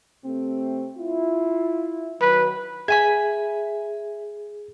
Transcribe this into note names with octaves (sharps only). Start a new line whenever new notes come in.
C3 A3 C4
E4 F4
D#3 F#3 B4
G#4 E5 G#5 B5 G#6